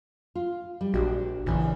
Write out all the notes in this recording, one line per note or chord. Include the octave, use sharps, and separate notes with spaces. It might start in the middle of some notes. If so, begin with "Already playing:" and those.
F4
G3
A#1 D4 F#4 G4
A#1 C#3 E3 D4